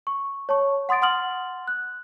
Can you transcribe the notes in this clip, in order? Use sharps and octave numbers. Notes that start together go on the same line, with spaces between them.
C#6
C#5 A5 C#6
F#5 C6 D#6 A6 D7
F#5 C6 D#6 F6 A6 F#7
F#6